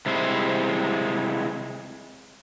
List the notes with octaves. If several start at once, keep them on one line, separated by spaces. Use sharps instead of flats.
C3 G3 G#3 E4 C5